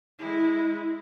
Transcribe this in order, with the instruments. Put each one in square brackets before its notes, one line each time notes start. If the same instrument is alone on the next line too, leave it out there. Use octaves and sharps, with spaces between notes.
[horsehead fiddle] G#3 E4